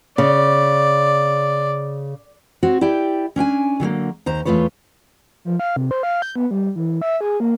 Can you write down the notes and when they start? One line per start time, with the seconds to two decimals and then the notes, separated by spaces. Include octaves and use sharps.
0.18 C#3 D5
2.63 C4 F#4 C#5
2.81 E4 G4 D5 G5
3.36 C#4 D4 G5 G#5
3.80 D3 F#3 A3 A#3
4.26 D#2 C5 A#5
4.45 E2 C#3 A3 F4 B4 C#5
5.45 F3
5.59 F5
5.76 C3
5.91 C5
6.03 F5
6.22 G6
6.36 B3
6.51 G3
6.76 E3
7.02 E5
7.21 G#4
7.40 A#3